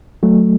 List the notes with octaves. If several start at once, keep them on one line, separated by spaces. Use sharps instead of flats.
F#3 A3